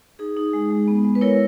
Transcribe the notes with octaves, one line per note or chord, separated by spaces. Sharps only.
D#4 G#4
D#4
G#3
G#3
B3
G#3
B4
E4 A#4 C#5